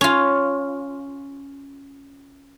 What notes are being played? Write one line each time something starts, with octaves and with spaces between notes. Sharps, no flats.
C#4 F4